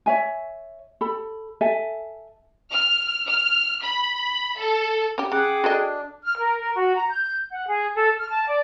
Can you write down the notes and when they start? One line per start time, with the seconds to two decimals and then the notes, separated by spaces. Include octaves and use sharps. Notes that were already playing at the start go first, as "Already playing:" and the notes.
0.06 C#5 E5 G#5
1.01 A4 B5
1.61 A4 E5 G#5
2.72 F6
3.28 F6
3.83 B5
4.59 A4
5.18 C#4 G4
5.32 C#3 G#4 F#5 G5 D6 F#6
5.64 D4 F#4 A4 D#5
6.25 F6
6.38 A#4
6.60 A#4
6.76 F#4
6.96 A#5
7.10 G6
7.51 F#5
7.67 G#4
7.95 A4
8.17 F6
8.30 A5
8.47 D5